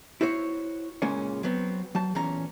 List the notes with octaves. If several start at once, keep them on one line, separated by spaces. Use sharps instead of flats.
E4 F#4 C5 C#5
C#2 A#2 C#3 G#3 A#3 C#4
F#3 B3 C4
F#3 A5
E2 A#2 C#4 A#5